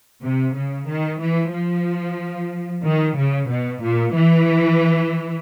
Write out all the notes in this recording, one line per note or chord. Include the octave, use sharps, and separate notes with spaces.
C3
C#3
D#3
E3
F3
D#3
C#3
B2
A#2
E3